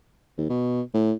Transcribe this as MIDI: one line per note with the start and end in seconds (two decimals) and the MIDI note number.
0.38 0.49 39
0.49 0.82 47
0.94 1.13 45